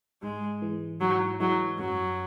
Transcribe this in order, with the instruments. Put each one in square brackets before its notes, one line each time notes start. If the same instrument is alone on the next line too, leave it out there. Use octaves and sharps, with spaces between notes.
[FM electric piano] G#2 [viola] G#3
[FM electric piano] E3 G#3
[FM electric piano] G#2 [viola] F#3
[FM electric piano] E3 G#3 [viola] F#3
[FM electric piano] F#2 [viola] F#3